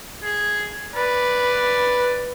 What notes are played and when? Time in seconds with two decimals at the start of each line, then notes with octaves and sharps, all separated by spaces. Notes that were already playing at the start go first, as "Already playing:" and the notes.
0.23 G#4
0.95 B4 D5